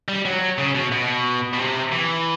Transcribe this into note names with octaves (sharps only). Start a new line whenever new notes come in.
G3
F#3
C#3
B2
B2
B2
C3
E3